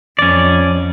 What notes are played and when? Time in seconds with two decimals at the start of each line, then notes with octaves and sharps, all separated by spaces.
0.19 F2 C#4 D5